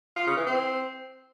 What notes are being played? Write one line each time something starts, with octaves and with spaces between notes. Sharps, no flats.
F4
C#3
E3
C4